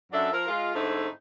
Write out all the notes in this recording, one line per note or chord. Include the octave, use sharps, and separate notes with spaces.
F#2 F#3 D4 A4 E5
F3 A#4
G#3 F4
G#2 D3 A3 C4 D#4 E4